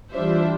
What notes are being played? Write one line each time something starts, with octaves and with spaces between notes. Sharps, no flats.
E3 G3 D4 F4 C5 E5